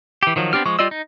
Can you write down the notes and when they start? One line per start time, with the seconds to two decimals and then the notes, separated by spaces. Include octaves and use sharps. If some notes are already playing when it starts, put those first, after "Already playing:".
0.23 E3 G4
0.36 D#3 F3 F#3
0.53 B3 C4 D4 G4 F6
0.66 F3 G#3 C#6
0.79 G3 F4 D5 D#5 E6
0.91 D#4